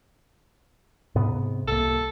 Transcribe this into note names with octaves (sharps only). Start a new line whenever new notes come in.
G#2 C3 B3
C2 A#3 A4